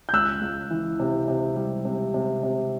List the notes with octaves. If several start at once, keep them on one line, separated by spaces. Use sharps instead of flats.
G6
C#2 E6 F#6
C#2
E3
C3
C3
G3
C3
C3
C3